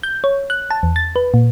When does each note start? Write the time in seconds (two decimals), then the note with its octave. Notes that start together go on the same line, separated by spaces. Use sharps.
0.03 G6
0.24 C#5
0.50 F#6
0.71 A5
0.83 E2
0.96 A6
1.16 B4
1.34 A#2